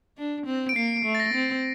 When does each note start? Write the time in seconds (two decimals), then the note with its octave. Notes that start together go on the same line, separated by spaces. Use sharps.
0.18 D4
0.46 C4
0.69 D7
0.76 A#3 C7
1.05 A3
1.15 A6
1.20 A#6
1.34 C4